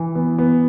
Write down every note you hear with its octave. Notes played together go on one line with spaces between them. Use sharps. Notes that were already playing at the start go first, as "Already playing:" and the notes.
Already playing: E3
B3
B3